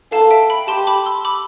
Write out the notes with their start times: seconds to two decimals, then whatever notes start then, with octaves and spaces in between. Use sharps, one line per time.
0.12 A4 F5 A5
0.31 E5 G5
0.50 G5 B5
0.68 G4 A5 C6
0.87 B5 D6
1.06 C6 E6
1.25 B5 D6